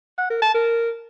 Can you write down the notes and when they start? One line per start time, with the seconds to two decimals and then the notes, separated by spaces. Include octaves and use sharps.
0.18 F#5
0.30 A#4
0.42 A5
0.54 A#4